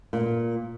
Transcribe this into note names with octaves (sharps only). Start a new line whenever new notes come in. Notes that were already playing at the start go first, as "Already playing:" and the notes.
A#2